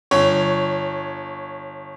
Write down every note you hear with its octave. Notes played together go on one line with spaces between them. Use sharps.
G1 C#5